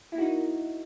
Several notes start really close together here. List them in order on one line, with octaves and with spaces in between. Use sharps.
E4 A#3 F#4 D#4